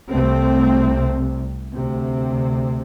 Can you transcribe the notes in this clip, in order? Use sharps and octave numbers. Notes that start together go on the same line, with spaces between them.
C2 C3 A3 C4
D2 C3